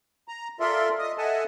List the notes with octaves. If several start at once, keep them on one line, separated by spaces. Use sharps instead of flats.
A#5
F4 A4 A#4 D5 E5 C6
D#5 D#6
A4 D#5 E5 F#5 G#5 A5